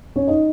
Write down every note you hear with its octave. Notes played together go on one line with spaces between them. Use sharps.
C#4 C#5
D#4 D#5